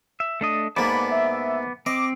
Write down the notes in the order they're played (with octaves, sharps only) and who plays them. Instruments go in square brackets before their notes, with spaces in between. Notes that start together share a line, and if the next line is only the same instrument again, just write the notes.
[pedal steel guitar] E5
A3 D4 D#5
[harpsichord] G#2 A#3 [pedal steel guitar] B3 D5 A5 [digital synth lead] B5
[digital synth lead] E5
[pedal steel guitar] C4 [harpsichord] D#5 [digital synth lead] D6